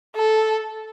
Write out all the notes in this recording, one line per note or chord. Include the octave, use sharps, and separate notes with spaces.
A4